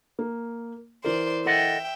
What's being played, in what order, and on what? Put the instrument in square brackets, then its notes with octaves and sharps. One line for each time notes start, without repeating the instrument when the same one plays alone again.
[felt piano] A#3
[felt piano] E3 E4 A#4 [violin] C5 D5
[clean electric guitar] A4 D#5 F#5 [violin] E5 G5